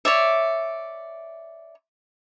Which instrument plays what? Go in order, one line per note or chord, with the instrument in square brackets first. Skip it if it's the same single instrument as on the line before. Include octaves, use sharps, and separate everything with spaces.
[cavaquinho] C#5 D5 E5